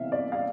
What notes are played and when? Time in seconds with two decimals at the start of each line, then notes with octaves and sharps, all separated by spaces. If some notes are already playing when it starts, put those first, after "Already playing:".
Already playing: C3 E3 B3 E5 F5
0.12 D5
0.32 F5